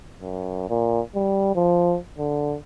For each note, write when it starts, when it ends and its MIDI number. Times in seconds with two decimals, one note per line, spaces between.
0.20 0.64 42
0.69 1.00 46
1.15 1.53 55
1.55 1.96 53
2.18 2.55 50